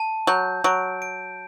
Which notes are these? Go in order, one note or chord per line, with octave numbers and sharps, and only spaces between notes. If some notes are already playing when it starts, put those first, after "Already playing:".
Already playing: A5
F#3 G6
F#3 D7
D7